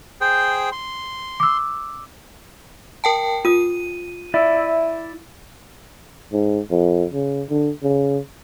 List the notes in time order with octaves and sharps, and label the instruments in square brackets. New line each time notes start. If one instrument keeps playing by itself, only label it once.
[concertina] G#4 C5 G5
C6
[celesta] D6 E6
[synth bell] A#4 G5 A5
[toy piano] F4 D#6 [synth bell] D#7
[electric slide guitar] E4 D5 E5
[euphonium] G#2
F2
C#3
D3
C#3